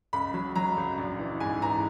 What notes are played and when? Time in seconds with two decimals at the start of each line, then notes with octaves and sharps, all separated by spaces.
0.13 C#2 B5
0.34 F#3
0.55 F#3 A#5
0.77 C#2
0.98 A#1
1.19 E3
1.40 G#2 G#5
1.62 E3 A#5